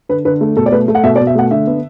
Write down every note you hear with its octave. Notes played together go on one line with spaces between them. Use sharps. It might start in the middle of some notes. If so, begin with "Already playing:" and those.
D3 B4
D3 B4
A3
B2 A4
D5
A3 B4
A3
F#5
B2 E5
D5
B2
E5
A3 F#5
D3 E5
B3